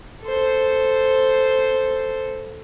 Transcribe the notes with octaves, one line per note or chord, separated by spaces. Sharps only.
A4 C5